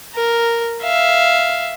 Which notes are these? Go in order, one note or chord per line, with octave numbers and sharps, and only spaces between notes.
A#4
E5 F5